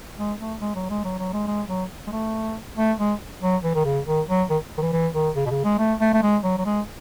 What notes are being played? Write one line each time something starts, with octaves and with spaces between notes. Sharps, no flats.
G#3
A3
G#3
F#3
G#3
F#3
F#3
G#3
G#3
F#3
G#3
A3
A3
G#3
F#3
E3
D#3
C#3
D#3
F#3
D#3
D#3
E3
E3
D#3
C#3
B2
C#3
G#3
A3
A3
A3
G#3
F#3
F#3
G#3